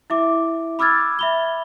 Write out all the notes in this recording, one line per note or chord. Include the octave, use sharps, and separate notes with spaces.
E4 E5 D6
B5 D6 E6 F6 G#6 A6
E5 B5 G7